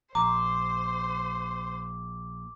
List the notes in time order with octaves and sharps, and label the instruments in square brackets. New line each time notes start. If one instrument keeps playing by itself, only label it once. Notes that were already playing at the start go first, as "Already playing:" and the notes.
[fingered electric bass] A#1 [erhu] C5 [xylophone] A#5 [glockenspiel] D6